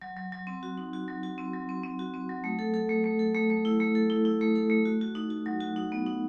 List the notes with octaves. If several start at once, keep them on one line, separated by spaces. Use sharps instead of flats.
F#3
F#3
F#3
C4
F#4
D#4
F#4
F#3
F#4
C4
F#3
C4
C4
F#4
C4
F#3
A3
A4
A4
A3
A3
A4
A3
A3
E4
A3
A4
E4
E4
A3
A4
A3
F#4
F#4
D#4
F#4
F#3
F#4
D#4
B3
D#4